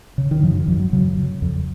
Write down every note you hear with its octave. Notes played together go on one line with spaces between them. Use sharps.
C#3
D#3
F#2 F3
D#3
F#2 F3
F#3
C#3 F#3
C#3
F2